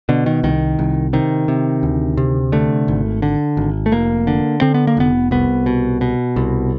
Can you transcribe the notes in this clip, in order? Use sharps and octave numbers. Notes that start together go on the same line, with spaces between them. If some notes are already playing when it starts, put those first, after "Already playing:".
B2 D3
D#3
C2 D#3
C2
C3 D#3
C3
D2
C3
D3 A3
G#1
D3
G#1
A3
F1 A#3
D3
D3 C4
B3
A#3
F1 B3
C2 B3
B2
B2
C2